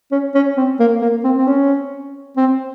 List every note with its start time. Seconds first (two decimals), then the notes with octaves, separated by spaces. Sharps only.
0.12 C#4
0.35 C#4
0.57 C4
0.79 A#3
1.02 A#3
1.24 C4
1.37 C4
1.47 C#4
2.37 C4